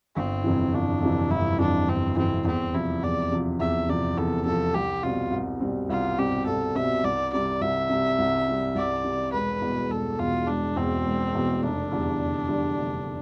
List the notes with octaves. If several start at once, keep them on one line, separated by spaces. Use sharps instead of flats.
G1 C4
F2 C3 E3
G1 D4
F2 C3 E3
G1 E4
F2 C3 E3 D4
G1 C4
F2 C3 E3 C4
E2 C4
C3 F3 E4
E2 D5
C3 F3
E2 E5
C3 F3 D5
E2 A4
C3 F3 A4
C2 G4
B2 G3 C4 F4
C2
B2 G3 C4
C2 F4
B2 G3 C4 G4
C2 A4
B2 G3 C4 E5
C2 D5
C3 G3 D5
C2 E5
C3 G3
C2
C3 G3
C2 D5
C3 G3
E1 B4
E2 B2
E1 A4
E2 B2 F4
E1 D4
E2 B2 C4
E1
E2 B2
F1 D4
E2 D3 G3
F1
E2 D3 G3
F1